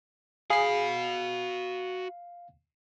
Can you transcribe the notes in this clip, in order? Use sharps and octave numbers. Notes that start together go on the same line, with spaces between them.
F#4 G#4 F5 B5 C7